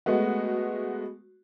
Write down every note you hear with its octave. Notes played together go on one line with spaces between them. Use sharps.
G#3 A3 B3 F#4